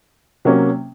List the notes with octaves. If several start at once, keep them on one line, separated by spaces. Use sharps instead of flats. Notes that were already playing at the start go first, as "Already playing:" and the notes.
C3 F#3 A#3 C#4